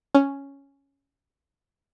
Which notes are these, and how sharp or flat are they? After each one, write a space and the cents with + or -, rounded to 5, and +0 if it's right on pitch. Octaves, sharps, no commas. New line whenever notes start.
C#4 +0